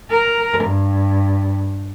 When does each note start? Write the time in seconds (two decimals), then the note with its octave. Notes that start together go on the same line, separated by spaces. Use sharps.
0.10 A#4
0.65 G2